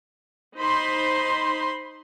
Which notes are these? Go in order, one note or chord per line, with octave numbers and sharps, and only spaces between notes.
D#4 C5 B5 C6